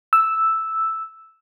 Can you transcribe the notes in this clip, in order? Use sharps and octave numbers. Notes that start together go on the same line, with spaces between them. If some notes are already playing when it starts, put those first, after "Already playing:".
E6